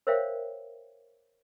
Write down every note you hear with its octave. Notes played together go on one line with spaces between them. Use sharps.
A#4 C5 C#5 E5 F5 G5